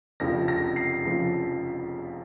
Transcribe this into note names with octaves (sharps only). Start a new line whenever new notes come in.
F1 F2 C#3 F3 A#6
A#6
C7
C#3 F3